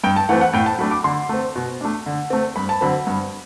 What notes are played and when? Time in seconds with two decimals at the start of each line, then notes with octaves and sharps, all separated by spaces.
0.04 G2 G5
0.16 A5
0.29 E3 A3 C4 F#5
0.41 F#5
0.53 A2 G5
0.66 A5
0.78 F#3 A3 D4 B5
0.91 D6
1.04 D3 C6
1.29 A3 C4
1.56 B2
1.81 A3 D4
2.06 D3
2.30 A3 C4
2.56 G2 B5
2.69 A5
2.81 D3 F#3 C4 B5
3.07 G2